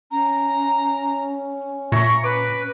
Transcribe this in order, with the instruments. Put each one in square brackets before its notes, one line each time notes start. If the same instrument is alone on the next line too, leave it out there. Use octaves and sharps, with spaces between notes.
[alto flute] C#4 [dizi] A#5
[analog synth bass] A#2 [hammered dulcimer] C#5 A#5 C#6 [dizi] E5
[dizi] B4 [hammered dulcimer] D6